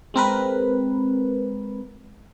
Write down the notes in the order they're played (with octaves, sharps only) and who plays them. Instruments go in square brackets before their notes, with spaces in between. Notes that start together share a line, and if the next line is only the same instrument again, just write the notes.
[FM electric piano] G#3 C4 A#4 B4